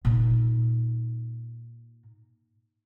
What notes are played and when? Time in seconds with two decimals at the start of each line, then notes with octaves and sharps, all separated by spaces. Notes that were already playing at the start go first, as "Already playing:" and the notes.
0.05 A#2 D#4